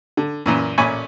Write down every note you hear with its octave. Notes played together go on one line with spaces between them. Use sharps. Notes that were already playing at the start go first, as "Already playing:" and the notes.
D3
F#2 A#2 E3
A1 A#2 C#4 G#5 B5 C#6